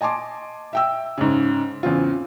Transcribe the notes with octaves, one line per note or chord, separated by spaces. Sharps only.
D#5 G#5 A5 C6 D6
E5 G5 E6
G#2 C#3
E2 C#3 C4 F4